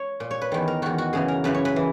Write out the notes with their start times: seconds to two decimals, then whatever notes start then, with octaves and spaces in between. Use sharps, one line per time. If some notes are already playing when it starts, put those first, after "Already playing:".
Already playing: C#5
0.20 A#2
0.31 C#5
0.41 B4
0.52 E2 D#3
0.68 A#4
0.82 E2 D#3 F#4
0.98 F#4
1.13 F#2 C#3 E3 G#4
1.28 A#4
1.44 F#2 C#3 E3 B4
1.54 C#5
1.65 B4
1.76 E3